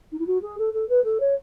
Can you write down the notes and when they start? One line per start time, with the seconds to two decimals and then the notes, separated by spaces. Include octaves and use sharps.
0.12 D#4
0.18 E4
0.26 F#4
0.42 G#4
0.58 A4
0.73 A4
0.89 B4
1.04 A4
1.20 C#5